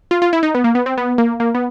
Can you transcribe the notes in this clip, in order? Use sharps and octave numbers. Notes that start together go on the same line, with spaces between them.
F4
F4
E4
D#4
B3
A#3
B3
C4
B3
A#3
A#3
B3